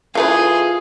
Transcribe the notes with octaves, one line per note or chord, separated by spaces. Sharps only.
E3 A3 F4 G#4 B4